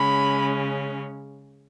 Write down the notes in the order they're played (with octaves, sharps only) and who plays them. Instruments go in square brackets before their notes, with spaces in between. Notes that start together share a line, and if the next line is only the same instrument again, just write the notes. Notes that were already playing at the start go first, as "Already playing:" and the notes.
Already playing: [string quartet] C#3 G#3 C#4 B5